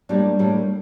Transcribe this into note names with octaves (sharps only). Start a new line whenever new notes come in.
A2 G3 A#3 D4
A2 G3 A#3